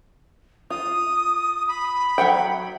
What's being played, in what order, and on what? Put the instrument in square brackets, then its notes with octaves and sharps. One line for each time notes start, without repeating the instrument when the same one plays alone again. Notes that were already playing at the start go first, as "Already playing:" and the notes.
[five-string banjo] F4 [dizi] D#6
[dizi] B5
[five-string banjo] F#3 F#5 G5